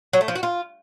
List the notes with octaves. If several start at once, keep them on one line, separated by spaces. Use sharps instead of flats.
F#3
A3
F3
F#4
F4